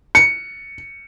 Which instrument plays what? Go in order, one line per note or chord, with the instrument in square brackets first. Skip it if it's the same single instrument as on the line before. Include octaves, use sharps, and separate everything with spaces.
[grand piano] C#7